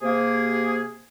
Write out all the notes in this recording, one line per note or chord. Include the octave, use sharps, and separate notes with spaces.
C3 A#3 G#4